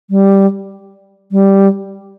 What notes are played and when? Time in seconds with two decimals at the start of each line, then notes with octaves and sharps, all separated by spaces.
0.10 G3
1.32 G3